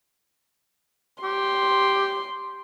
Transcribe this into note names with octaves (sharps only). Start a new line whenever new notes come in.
G4 C6